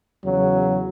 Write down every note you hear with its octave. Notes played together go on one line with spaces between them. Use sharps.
E2 C#3 F#3